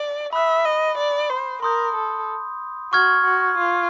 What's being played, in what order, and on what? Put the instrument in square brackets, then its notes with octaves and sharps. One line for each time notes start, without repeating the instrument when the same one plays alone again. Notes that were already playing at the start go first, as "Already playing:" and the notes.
Already playing: [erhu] D5
[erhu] E5 [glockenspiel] B5 D#6 F#6
[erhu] D#5
D5
C5
[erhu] A#4 [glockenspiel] C6 D#6 G6
[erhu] A4
[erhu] F#4 [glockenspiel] C#6 F6 G#6
[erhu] F#4
F4